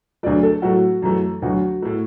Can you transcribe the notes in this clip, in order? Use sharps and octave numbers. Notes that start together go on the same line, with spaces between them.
D2 D3 F#3 A3 D5
A4
A2 F#3 A3 F#4
F#2 E3 A3
D2 D3 F#3 F#4
A2 A3